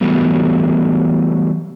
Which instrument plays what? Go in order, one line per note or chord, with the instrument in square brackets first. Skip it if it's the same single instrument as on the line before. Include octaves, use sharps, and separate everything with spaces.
[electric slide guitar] E3 F#3 G3 A3 B3